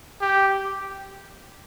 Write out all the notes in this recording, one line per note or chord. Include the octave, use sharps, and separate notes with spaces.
G4